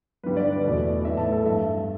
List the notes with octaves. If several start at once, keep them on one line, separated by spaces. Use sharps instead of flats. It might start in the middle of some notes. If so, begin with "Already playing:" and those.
G2 D3 G3 B4
D5
B4
E2 B2 A3 D5
A2 E3 A3 E5
A5
A4
G2 G3 E5